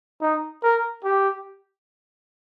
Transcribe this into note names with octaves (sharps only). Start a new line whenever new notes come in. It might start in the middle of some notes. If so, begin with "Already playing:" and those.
D#4
A#4
G4